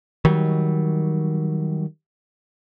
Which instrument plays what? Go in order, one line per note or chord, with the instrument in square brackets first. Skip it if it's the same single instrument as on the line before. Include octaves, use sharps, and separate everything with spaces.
[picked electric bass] D#3 F#3 G3